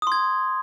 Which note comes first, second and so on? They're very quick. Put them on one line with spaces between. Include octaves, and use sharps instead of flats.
D#6 C6 G#6